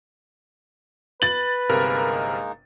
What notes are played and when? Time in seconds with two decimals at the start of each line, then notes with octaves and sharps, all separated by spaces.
1.22 B4 A6 F#7
1.70 G1 C3 G#3 A#3 D#4 A#4